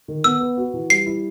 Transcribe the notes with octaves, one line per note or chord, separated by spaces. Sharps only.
D#3
B3 E6
B4
F#4
E3
G3 C7
E4